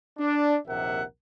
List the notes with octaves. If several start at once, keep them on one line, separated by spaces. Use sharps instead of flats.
D4
A#1 D#2 C3 A#4 E5 F#5